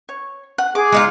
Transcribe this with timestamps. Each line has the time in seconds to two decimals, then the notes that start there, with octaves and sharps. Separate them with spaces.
0.09 C#5
0.58 F#5
0.75 G#4 D6
0.92 G#3 D#4 F4